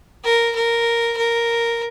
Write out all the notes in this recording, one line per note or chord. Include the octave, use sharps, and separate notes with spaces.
A#4
A#4
A#4